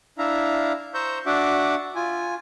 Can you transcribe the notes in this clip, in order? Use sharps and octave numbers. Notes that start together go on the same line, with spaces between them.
D4 E4 E5 F5 A#5
C5 A#5 C#6 E6 G6
D4 F#4 E5 F#5 D6
F4 G#5